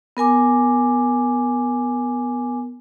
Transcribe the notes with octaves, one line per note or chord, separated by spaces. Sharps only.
B3 A#4 G#5 D6